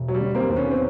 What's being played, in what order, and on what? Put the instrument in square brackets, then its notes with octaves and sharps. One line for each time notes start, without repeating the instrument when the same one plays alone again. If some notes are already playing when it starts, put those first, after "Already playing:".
Already playing: [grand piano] E1
[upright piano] F#3
G3
[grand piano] D3
[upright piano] A#3 C4
[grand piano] D#2
[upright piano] B3 C#4
C4